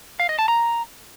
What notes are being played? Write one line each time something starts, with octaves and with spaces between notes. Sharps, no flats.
F5
D#5
A5
A#5